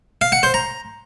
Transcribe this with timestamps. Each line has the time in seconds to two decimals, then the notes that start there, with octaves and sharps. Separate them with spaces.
0.21 F5
0.32 F#5
0.43 C5
0.54 A#5